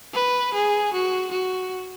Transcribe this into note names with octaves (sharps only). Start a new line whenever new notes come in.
B4
G#4
F#4
F#4